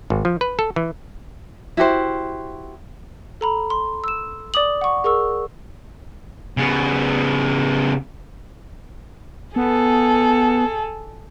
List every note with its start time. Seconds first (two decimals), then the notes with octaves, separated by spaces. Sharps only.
0.10 G#1
0.25 F3
0.41 B4
0.59 A4
0.76 E3
1.77 E4 F#4 G4 C5
3.41 A4 A#5 B5
3.70 C6
4.04 E6 E7
4.54 D5 D6 D#6 F#7
4.81 F#5 C#6
5.04 G#4 A#4 C#6 E6
6.57 C#3 B3
9.56 B3 G#4 A4